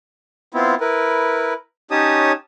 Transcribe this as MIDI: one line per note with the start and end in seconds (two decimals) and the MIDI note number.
0.54 0.75 59
0.54 0.75 60
0.54 0.75 64
0.54 0.75 65
0.80 1.53 64
0.80 1.53 70
0.80 1.53 71
1.91 2.32 61
1.91 2.32 63
1.91 2.32 67
1.91 2.32 73
1.91 2.32 81
1.91 2.32 87